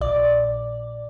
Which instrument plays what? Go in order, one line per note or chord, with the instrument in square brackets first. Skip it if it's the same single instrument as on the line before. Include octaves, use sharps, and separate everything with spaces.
[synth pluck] A#1 D5